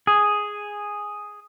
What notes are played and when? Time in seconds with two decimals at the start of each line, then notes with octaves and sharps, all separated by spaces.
0.07 G#4